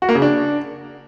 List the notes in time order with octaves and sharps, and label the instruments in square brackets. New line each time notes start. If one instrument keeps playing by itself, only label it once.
[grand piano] F#4
A#3
C#3
D4